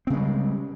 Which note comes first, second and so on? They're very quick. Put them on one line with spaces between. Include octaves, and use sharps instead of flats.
C4 C#3 G#3 G3